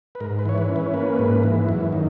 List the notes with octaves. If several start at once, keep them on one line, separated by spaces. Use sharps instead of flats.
B4
G#2 A#4
B4
E3 C#5
B4
C#4
B4
A#3 B4
G#2
E3
F#2
D#3